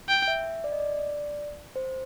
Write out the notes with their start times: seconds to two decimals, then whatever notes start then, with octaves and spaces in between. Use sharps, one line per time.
0.09 G5
0.28 E5
0.64 D5
0.72 D#5
0.80 D5
1.76 C5